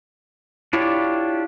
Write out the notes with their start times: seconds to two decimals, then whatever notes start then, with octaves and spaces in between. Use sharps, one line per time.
0.73 D4 E4 F4 G4 C#5 D5